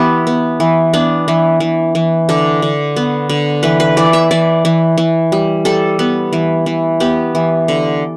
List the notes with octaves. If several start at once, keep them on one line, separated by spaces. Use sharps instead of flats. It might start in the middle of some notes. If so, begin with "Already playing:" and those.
Already playing: E3 B3 E4 G4 B4
B3
E3
B3 D4
E3
E3
E3
D3 D4
D3
B3
D3
E3 B4
B4
E3 D5
E5
E3 D5
E3
E3
G3
G3 A4
B3
E3
E3
B3 G4
E3
D3